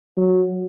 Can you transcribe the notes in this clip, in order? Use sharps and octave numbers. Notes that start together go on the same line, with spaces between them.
F#3